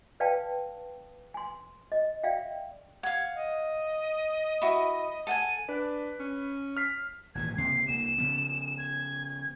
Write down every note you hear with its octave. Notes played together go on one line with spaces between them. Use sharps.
B4 D5 F5 G5 A5
G#5 C6
D#5
D5 E5 F5 G5
F5 F#5 G#6
D#5
E4 F#4
A4 F#5 G#5 D#7
D4 B4
C#4
F6 B6 C7
G#1 A#2 E3 G#6
C#2 C3 A#3 C7
C2 A#3 E7
C#3 F3 B3
G#6